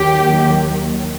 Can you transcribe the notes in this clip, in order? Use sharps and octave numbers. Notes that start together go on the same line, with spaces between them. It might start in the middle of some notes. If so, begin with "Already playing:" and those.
Already playing: D#2 D#3 F#3 G4